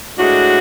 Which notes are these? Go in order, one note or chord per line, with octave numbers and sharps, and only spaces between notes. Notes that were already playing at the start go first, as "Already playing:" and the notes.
A2 G#3 D4 F#4